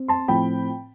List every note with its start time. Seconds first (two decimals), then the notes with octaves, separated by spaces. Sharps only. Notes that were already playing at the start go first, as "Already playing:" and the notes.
Already playing: C4
0.08 A5 C6
0.28 A2 F3 C4 G5 B5